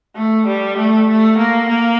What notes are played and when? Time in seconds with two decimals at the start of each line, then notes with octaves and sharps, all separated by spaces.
0.16 A3
0.47 G3
0.77 A3
1.08 A3
1.38 A#3
1.69 A#3